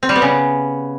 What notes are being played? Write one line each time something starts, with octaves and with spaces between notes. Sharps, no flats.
C4
G3
B3
C#3